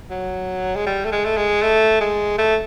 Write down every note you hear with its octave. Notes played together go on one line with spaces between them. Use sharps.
F#3
G#3
G3
A3
G#3
A3
G#3
A3
G#3
A3